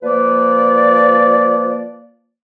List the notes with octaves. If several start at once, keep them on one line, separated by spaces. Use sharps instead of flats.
F3 A#3 B4 D5